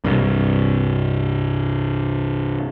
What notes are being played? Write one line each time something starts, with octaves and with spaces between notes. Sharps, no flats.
C2 G2